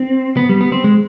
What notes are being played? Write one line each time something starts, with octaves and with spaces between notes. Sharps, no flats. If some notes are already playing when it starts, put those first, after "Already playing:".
Already playing: C4
B3
G3
B3
C4
G#3